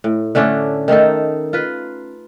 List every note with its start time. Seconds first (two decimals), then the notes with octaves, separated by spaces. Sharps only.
0.04 A2
0.35 D3 A3 C#4 D4
0.88 D#3 A3 D#4 A4
1.53 F4 B4